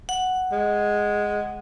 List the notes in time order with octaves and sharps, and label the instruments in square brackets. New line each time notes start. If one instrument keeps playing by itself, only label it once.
[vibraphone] F#5
[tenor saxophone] G#3